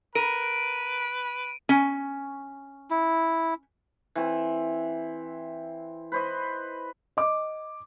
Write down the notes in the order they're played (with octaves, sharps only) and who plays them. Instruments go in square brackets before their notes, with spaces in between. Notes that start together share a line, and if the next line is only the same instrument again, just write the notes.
[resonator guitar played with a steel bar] A#4 [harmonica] B4 [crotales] D7 D#7
[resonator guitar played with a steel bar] C#4 G#5
[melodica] E4
[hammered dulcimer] E3 C4
B4 C5 D#5
[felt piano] D#5 D6